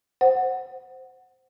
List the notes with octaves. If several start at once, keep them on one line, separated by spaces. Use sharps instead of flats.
C5 F#5